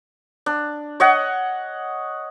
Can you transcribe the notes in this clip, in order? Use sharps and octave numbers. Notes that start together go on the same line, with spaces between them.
D4
C#5 D#5 F#5